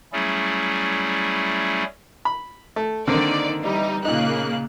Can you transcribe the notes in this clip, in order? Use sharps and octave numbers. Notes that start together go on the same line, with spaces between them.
F#3 G3 A3 C#4 E4 G#4
B5
A3
D3 D#3 A#3 C4 D5
E3 G3 D#4
A#2 C#3 A#3 D#4 F#6